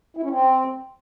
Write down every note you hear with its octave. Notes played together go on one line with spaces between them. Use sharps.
E4
C#4
C4